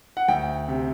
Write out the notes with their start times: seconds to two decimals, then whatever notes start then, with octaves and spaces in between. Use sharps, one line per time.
0.17 F#5
0.28 D2 G5
0.68 C3